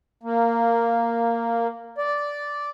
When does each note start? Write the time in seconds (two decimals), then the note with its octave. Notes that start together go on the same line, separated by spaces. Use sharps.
0.23 A#3
1.98 D5